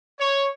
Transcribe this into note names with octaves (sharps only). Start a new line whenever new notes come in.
C#5